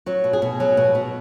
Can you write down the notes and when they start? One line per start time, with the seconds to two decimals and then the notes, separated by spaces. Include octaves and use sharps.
0.06 F#3 F#4
0.24 B2
0.33 G#4
0.42 B2
0.60 F#3
0.77 B2
0.95 B2